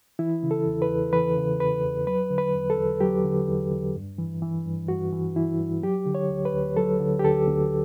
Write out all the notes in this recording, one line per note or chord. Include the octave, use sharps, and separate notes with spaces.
E3 E4
C#3
A4
E2
B4
E2
E3 B4
C#3
E2 B4
E2
F#3 B4
D3
B4
E2
A4
E2
F#3 G4
D3
E2
E2
G2
E3
E3
G2
G2 F#4
E3
E3 E4
G2
F#3 G4
D3
C#5
D2
B4
D2
F#3 A4
D3
G4
D2 A4
D2